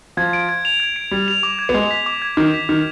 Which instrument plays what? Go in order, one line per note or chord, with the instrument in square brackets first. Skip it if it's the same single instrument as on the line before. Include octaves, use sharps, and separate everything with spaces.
[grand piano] F3 [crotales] G#6
[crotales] D7
G#6
F7
G#6
D7
[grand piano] G3 [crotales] G#6
[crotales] F7
D6
G#6
[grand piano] B3
[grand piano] G#3 [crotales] D6
[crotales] B6
D6
G#6
[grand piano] D#3 [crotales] D6
[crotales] B6
[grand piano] D#3 [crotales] F6